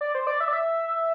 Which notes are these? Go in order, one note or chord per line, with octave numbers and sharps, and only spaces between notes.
D5
C5
D5
E5
D5
E5